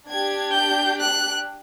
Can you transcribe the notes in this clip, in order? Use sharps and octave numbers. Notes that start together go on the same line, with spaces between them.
D4 G4 G#6
G6
F#6